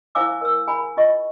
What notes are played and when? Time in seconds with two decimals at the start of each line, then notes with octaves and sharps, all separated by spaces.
0.15 E4 C5 F5 G#5 D6 E6
0.41 A#4 E6
0.67 G#4 G#5 A#5 B5
0.97 F4 D#5 C#6